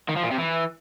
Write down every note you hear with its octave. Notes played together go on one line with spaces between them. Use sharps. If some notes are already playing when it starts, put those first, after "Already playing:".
D#3
F3
A#2
C3
E3